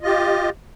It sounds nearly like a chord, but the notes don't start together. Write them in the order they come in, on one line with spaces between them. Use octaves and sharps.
D#5 F4 G4